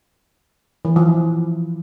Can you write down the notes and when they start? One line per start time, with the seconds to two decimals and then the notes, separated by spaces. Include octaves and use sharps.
0.85 E3
0.96 F3
1.08 E4